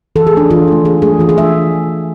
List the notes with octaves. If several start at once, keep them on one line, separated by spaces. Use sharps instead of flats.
E3 A4
G#4
A3 D4
E3 F4
A3 D4
E3 G#4
A3 D4 G#4
E3 F4
G#4
A3 D4 E5